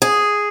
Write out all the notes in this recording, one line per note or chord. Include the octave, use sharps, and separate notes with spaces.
G#4